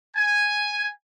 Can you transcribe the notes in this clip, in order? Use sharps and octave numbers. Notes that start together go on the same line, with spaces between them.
G#5